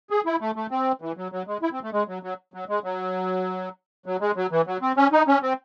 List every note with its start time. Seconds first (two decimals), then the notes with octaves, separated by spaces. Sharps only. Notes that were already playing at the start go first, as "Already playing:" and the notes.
0.10 G#4
0.26 E4
0.41 A3
0.56 A3
0.71 C4
1.02 E3
1.17 F#3
1.32 F#3
1.47 G#3
1.62 E4
1.72 C4
1.83 A3
1.93 G#3
2.08 F#3
2.23 F#3
2.54 F#3
2.69 G#3
2.84 F#3
4.06 F#3
4.21 G#3
4.36 F#3
4.51 E3
4.67 F#3
4.82 C4
4.97 C#4
5.12 D#4
5.28 C#4
5.43 C4